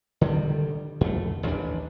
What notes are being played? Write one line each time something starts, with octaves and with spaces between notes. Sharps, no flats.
D3 D#3 G3
F2 A3
A1 D#2 G3 D4